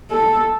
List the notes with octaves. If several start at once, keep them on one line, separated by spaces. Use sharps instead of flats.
A4